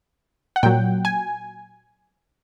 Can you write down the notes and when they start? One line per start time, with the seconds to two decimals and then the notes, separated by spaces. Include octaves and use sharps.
0.56 F#5
0.63 A#2 F#3 G5
1.05 G#5